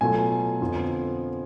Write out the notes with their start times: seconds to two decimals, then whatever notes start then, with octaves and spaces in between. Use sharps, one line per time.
0.01 B2 F#3 A3 F4 G#5
0.61 F2 D3 F3 B3 F4